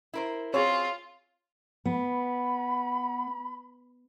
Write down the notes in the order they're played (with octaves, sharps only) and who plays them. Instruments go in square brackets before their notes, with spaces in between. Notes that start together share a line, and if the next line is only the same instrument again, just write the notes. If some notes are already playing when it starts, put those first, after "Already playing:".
[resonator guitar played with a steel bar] E4 A#4 C5
[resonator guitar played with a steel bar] C4 G#4 [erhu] F4 [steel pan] C#5
[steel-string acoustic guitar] B3 [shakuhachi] B5